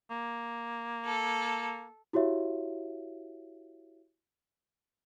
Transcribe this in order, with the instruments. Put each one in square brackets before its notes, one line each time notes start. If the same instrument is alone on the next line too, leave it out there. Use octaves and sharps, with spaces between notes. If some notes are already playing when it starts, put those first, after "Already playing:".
[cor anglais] A#3
[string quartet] A4
[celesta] E4 F#4 G4 C#5 E5 F5